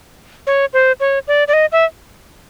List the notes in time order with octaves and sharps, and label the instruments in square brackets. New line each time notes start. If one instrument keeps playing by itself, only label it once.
[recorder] C#5
C5
C#5
D5
D5
D#5
E5